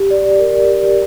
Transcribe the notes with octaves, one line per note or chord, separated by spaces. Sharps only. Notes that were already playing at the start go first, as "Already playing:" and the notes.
Already playing: G4
D5
A#4
G4